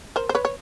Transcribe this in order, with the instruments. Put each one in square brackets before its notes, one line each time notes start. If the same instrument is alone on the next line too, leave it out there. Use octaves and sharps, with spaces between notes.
[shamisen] A#4 C5
C5
B4 C#5
C#5